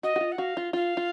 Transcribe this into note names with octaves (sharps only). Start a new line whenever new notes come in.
F#4 D#5
F#4
F4
F#5
F#4 F5
F4
F4 F5
F4